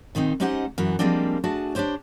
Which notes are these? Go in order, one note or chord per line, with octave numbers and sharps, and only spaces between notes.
A#2 D#3 C4 D#4
G#3 C#4 D#4 G4 C5 F#5
F#2 E3 F#4
F3 G3 G#3 A#3 C4 D4
A3 D4 F#4 G#4 A5
D4 F4 G4 C5 C#5